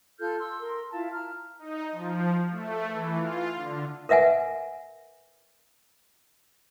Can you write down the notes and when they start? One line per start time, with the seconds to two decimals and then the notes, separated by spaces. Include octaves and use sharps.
0.19 F4 A4 F6 G6
0.39 C6 E6
0.61 A#4 C6
0.93 E4 F4 F5 A5
1.12 A#5 F6
1.59 D#4
1.92 F3
2.50 A3
2.88 E3
3.18 F4
3.55 D3
4.09 A#4 B4 E5 F#5 G#5